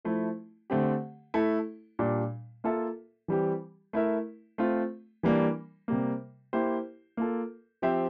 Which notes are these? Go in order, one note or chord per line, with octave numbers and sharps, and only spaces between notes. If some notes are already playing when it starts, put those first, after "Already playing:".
F3 A3 E4
D3 A3 C4 G4
A3 E4 A4
A#2 G3 D4
A#3 F4 A4 E5
E3 G3 C4 G4
A3 E4 A#4 E5
A3 C4 F4
E3 G3 A#3 D4
C3 G3 A#3
A#3 E4 G4 C5
A#3 F4 A4
F3 C4 G4 C5 E5